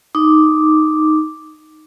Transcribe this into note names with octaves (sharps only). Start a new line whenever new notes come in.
D#4 D6